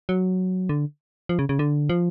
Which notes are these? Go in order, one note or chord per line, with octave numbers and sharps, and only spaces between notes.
F#3
D3
F3
C#3
C#3
D3
F3